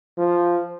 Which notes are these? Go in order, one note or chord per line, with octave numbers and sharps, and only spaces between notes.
F3